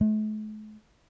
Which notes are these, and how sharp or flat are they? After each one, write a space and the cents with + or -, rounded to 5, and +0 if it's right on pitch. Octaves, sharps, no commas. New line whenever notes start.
A3 -45